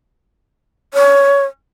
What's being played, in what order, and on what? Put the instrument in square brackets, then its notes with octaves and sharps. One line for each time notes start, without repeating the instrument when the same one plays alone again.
[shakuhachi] C#5